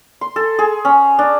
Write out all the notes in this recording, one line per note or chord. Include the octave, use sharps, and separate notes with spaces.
C6
A4
G#4
C#4
D4